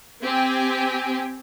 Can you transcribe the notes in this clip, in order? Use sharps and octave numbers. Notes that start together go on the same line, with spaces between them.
C4 G4 G#5